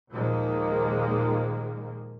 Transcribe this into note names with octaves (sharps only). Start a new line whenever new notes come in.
D#2 A#2 D#3 F3 G#3 A#3